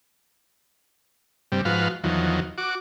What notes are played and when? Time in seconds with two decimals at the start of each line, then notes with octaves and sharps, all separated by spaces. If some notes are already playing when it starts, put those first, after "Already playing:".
1.52 G2 C3 G3
1.65 G#2 F3 F#4 B4 F5
2.04 E2 D#3 F3 F#3
2.58 F#4 D6